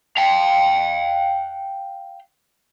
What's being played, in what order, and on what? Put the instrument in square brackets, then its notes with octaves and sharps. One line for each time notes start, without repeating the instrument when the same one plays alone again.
[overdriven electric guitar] F5 G5